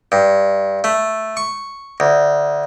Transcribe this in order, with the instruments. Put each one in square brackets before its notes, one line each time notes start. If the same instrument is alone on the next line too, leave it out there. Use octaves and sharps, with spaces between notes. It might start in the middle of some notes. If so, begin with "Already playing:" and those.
[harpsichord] G2
A3
C#6
D2